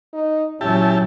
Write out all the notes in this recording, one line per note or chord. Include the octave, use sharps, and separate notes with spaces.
D#4
A#2 F#3 C#4 E4 G4 A5